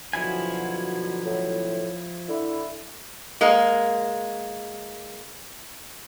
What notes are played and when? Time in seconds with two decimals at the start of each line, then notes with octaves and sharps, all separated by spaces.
0.13 B2 D3 F3 F#3 E4 G#5
1.25 A2
2.29 D3 E4
3.41 G#3 A#3